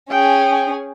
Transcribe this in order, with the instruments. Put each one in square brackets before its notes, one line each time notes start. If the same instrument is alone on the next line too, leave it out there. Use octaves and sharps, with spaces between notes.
[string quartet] C#4 G#4 [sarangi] G5